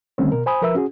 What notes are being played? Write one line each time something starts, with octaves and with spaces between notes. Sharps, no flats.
D3 D#3 G3 A3 C4 C#4
B2 A#4
C5 G#5 B5 D#6
F3 A#4 B4 E5 E6
C#4 F#4 G#4